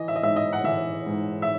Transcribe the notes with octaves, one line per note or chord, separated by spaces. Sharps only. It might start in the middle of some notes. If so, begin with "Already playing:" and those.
Already playing: E3 D#5
E5
D#5
G#2 E5
D#5
F#5
E3 E5
G#2
E5